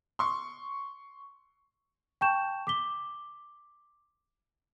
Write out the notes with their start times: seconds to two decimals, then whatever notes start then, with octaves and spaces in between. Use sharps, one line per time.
0.19 C6 C#6
2.21 G5 A5 C#6 G6 E7
2.67 D6 B6 G7